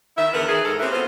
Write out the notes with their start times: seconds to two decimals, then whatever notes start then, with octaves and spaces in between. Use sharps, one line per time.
0.17 D#3 E4 E5
0.33 E2 D3 E3 B3 A#4
0.48 D#3 E3 G#4
0.65 G#2 A4 A#4
0.80 A#3 C4 C#4 E4 G4 B4
0.92 F#3 B3 C4 F4 A4 C5